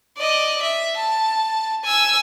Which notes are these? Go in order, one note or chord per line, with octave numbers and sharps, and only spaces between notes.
D5 D#5
E5
A5
G#5 E6